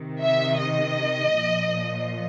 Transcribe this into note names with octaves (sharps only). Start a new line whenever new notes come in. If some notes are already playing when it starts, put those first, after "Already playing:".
Already playing: C3 D#3
E5
D#5
A#2 F3